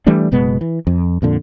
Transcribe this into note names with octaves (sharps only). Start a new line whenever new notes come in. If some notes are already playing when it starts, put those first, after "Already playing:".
E3 G3 A3 D4
F#1 B2 G#3 B3
E3
F2
F2 A#2 D3